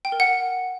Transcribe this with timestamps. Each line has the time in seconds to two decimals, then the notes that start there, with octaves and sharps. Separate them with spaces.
0.05 G5
0.12 A#4
0.20 F#5